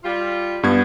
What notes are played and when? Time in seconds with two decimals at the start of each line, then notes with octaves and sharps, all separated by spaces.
0.04 G3 F4
0.63 G2 B3 G#6